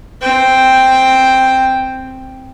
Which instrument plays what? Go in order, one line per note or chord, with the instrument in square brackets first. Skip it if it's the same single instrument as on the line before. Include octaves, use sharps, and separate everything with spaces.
[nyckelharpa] C4 G5